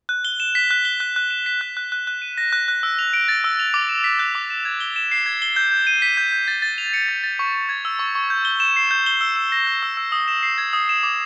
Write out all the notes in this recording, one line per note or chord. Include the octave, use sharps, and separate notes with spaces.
F#6
G7
E7
B6
F#6
G7
F#6
F#6
E7
B6
F#6
F#6
F#6
F#6
D#7
A#6
F#6
F#6
E6
F7
D7
A6
E6
F7
D6
E7
B6
F#6
D6
E7
G#6
G7
E7
C7
G#6
G7
G6
G6
D#7
B6
G6
G6
A6
A6
F7
C#7
A6
A6
C#6
C#6
G#6
E6
C#6
C#6
G6
G7
E7
C7
G6
G7
E6
E6
A#6
G6
E6
E6
D#6
E7
C7
G#6
D#6
E7
D6